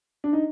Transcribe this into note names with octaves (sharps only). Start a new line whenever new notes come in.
D4
D#4